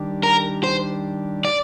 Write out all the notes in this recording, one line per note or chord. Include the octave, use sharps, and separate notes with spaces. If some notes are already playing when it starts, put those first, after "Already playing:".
Already playing: D#3 G3 D4 G4
A#4
C5
D5